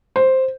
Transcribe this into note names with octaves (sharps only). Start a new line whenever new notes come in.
C5